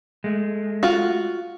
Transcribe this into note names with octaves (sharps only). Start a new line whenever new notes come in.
G#3 A3
F4 F#4